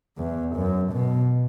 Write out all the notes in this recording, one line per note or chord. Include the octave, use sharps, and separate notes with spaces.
E2
F#2
B2